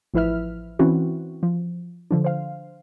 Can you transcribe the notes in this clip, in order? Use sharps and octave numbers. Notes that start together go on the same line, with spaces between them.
A1 F3 E4 B4 E5 F6
E3 C4 C#4 E4 F#4
F3
D3 F3 D4
C5 F5